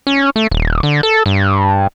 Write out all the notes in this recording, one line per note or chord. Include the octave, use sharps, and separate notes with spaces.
C#4
A3
D#1
D3
A4
G2